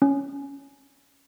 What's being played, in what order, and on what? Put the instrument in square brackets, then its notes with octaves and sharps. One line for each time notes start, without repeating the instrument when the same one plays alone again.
[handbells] C#4